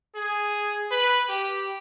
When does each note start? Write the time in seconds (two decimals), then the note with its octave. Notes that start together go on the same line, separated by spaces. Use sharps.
0.15 G#4
0.91 B4
1.29 G4